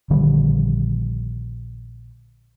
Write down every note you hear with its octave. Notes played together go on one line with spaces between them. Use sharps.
A#1 D3 D#3 G3